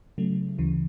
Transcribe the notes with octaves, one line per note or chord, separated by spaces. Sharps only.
C#3 F#3 A3
D2 C#3 E3